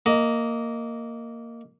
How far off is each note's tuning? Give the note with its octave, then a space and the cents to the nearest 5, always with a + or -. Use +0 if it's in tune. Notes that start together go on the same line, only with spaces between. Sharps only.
A#3 -10 D#5 +0